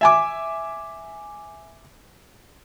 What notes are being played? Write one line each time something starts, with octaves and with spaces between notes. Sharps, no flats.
E5 G#5 D6